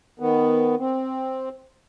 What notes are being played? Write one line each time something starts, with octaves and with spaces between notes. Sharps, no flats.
D#3 B3
C4